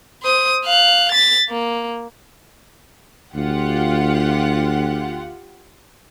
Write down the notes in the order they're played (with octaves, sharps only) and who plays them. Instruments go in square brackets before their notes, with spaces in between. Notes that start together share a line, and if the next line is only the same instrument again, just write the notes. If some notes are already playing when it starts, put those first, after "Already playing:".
[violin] C5 D#6
F5 F#6
A6 B6
A#3
[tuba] D2 [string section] F4 G4 F#5